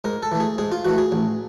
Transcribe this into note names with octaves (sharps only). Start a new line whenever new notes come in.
G#2 A#4
A4
E3 A3
G#4
G#2 G#4
F4
E3 A3 F#4
G#4
A1